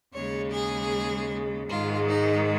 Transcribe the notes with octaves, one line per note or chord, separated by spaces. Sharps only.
D#2 C#3 G#3 C#5
G#4
G#2 D#3 G#3 F4
D#4